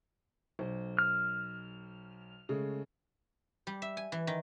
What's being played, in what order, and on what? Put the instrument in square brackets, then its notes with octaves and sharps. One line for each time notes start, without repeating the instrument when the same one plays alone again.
[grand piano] B1 C5
[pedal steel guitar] F6
[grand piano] C#3 G#3 A3
[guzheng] G3
E5
G#5
E3
D#3